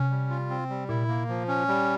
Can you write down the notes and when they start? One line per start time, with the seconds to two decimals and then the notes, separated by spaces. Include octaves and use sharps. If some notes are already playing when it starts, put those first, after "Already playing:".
Already playing: C3 C#4
0.10 G3
0.30 F4
0.50 C4
0.70 G3
0.89 A#2 E4
1.08 A#3
1.29 F3
1.48 C#4
1.68 G3